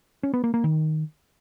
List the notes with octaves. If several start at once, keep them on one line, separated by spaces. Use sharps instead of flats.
C#4
B3
A#3
A#3
D#3